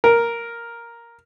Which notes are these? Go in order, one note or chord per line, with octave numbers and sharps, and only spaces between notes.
A#4